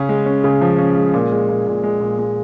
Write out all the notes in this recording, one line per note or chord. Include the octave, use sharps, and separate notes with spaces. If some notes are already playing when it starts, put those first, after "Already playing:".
Already playing: C#3 C#4
G#3
C#4
C#3
F3
C#4
G#3
A#2
G#3
A#2
A#2
G#3
A#2
G#3